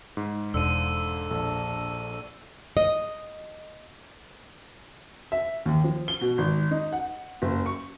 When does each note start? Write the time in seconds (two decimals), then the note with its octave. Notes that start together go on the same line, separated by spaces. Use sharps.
0.17 G#2
0.54 E1 D3 F3 D5 E6 D#7
1.31 A#1 A4
2.77 D#5
5.32 E5
5.66 D#2
5.84 F3
6.08 G7
6.21 B2
6.38 G#1
6.71 D#4
6.92 F#5
7.42 F#1
7.66 C#6